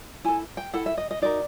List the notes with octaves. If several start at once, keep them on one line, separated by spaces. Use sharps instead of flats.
E4 A4 G#5
G5
E4 A4 F#5
E5
D#5
D#5
D#4 F#4 A#4 D5